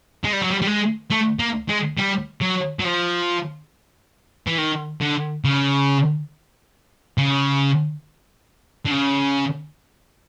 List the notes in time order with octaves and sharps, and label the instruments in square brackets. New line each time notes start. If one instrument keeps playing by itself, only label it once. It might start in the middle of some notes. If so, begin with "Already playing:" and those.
[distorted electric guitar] G#3
G3
F#3
G3
G3
G#3
A3
A#3
G#3
G3
F#3
F#3
F3
E3
D#3
D3
C#3
C#3
D3
C#3